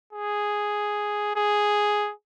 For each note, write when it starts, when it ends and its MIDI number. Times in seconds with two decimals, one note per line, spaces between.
0.13 1.34 68
1.36 2.12 68